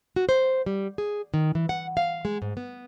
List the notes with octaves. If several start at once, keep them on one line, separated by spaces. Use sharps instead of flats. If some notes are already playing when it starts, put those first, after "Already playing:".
F#4
C5
G3
G#4
D#3
E3
F#5
F5
G#3
G#2
B3